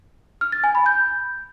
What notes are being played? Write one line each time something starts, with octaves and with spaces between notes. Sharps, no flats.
F6
A6
G#5
B5
G6